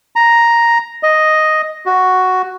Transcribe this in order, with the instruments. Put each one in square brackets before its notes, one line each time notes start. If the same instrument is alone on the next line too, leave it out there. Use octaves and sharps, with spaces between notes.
[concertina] A#5
D#5
F#4